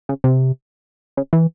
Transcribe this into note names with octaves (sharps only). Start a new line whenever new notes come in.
C#3
C3
C#3
E3